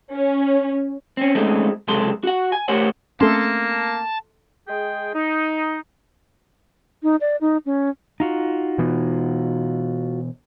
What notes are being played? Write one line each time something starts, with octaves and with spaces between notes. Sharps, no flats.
C#4
C4 C#4
G#3 A3 C4 C#4 D#4 A4
C#2 F#2 C3 G#3 A4 C6
F#4 F#5
G#5
A3 G4 A#4 C5 C#5 F#5
A3 A#3 C4 C#4 A4 A5 C6
G#3 G#4 G5
D#4
D#4
D5
D#4
C#4
D#4 F4 F#4
B2 E3 B3